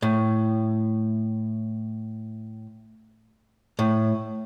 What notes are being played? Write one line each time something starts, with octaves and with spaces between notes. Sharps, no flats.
A2
A2